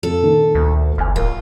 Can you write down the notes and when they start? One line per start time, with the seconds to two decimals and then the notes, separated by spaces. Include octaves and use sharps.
0.03 F2 A4
0.22 A#2 D#3
0.55 D2
0.98 F#1 G#5 F6
1.16 D1 F4 A#4